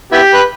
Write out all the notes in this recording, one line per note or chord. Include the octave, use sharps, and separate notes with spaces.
B3 E4 G4
B4